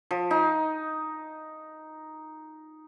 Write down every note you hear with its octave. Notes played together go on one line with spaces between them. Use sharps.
F3
D#4